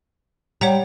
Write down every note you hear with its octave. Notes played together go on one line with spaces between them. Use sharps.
G3 C#5 F#5 A#5